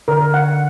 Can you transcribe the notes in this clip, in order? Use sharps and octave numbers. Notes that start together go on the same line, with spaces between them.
D3 A#4
F#5